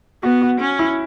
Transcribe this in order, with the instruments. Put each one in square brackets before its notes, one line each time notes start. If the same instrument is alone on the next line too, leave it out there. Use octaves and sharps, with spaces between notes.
[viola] B3 [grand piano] F#4
[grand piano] F#4
[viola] C#4
[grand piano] E4